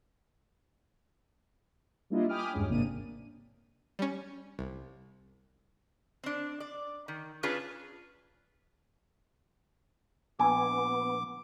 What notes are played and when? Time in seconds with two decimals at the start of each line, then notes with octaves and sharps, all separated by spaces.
2.10 G3 A#3 D4 E4 F4 D#5
2.29 G5 G#5 B5 D6 D#6 F6
2.53 E2 G2 G#3 C#4
2.69 G#1 C3 A#3 D4 D#7
3.99 G3 C#4
4.59 C2
6.24 C4 D4
6.60 D5
7.08 D#3
7.43 C#4 D4 F4 G#4 B4
10.39 A#1 B3 G#5 D6